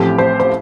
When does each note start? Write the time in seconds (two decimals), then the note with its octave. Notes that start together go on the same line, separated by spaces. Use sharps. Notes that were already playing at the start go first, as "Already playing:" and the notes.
Already playing: A1 A2 F3 A3 C4 G4
0.18 C5
0.40 C5